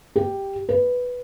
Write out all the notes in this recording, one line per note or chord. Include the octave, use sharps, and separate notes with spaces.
G4
B4